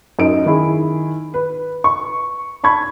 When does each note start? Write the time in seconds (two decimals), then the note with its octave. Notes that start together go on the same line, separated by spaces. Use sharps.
0.19 F#2 D#4 D#5 D7
0.46 D#3 E4 G#4
1.34 B4
1.84 C#6
2.64 A5 B5 C#6 G#6